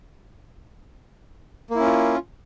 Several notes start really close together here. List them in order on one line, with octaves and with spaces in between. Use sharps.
A#3 E4 C#4 F4